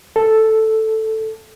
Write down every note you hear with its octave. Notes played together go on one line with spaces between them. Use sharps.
A4